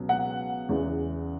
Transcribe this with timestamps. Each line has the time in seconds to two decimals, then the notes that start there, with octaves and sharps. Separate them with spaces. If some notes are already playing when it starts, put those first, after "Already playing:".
Already playing: C#2 B2 F#3
0.09 F#5
0.69 E2 C#3 E3